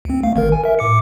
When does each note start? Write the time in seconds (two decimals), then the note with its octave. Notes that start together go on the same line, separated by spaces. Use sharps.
0.05 D2 C4
0.23 A3 F5
0.36 G#1 D#3 A#4
0.52 G#5
0.64 A#4 E5
0.79 A2 D6 C#7